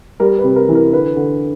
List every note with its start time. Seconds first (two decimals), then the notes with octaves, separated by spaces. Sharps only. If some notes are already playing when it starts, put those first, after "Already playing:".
0.20 G3 A#4
0.38 B4
0.44 C3
0.56 A#4
0.69 E3
0.75 A#4
0.93 D3 B4
1.16 D3